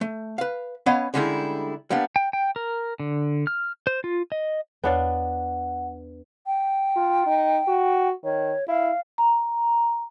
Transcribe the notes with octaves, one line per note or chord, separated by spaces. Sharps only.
A3
B4 F5
B3 C#4 C#5 D#5 F5 B5
D3 G3 G#3 C#4 D#4 E4
G3 A#3 B3 D4
G5
G5
A#4
D3
F6
C5
F4
D#5
E2 B3 D4 C#5 F5 F#5 A6
G5
F4
D#4
F#4
D#3 C#5
E4 F5
A#5